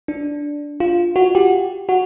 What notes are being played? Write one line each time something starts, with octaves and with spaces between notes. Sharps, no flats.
D4
F4
F#4
G4
F#4